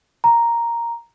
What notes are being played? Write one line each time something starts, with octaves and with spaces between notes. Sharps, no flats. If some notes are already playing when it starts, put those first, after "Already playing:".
A#5